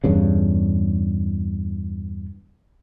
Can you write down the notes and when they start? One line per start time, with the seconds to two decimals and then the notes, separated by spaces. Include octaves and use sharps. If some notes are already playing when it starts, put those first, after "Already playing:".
0.04 E2 G2 C#3